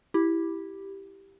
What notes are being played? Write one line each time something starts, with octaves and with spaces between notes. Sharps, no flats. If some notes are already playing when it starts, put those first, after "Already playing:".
E4 G4